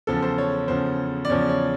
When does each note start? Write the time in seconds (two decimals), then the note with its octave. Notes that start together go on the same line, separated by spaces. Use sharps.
0.07 E2 C#3 F3 A4
0.22 C5
0.38 C#5
0.68 E2 C#3 F3 C5
1.25 D5
1.29 E2 C#3 F3 C#5
1.49 C#5